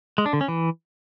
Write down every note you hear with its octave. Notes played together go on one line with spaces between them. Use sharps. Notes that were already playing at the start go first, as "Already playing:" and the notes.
G#3
D4
D3
C#4
E3